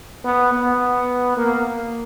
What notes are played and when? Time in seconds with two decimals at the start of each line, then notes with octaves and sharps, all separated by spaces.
0.24 B3
0.53 B3
1.37 A#3